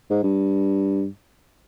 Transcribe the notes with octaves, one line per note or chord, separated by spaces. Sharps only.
G#2
G2